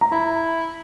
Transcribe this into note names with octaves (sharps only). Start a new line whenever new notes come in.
A#5
E4 B5